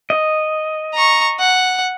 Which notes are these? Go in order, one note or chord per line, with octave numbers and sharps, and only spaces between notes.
D#5
A#5 C#6
F#5